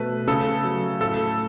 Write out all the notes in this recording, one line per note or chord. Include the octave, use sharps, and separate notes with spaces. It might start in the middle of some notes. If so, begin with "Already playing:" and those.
Already playing: B2 A3 B4
C#3 A4
F#3
A2 A4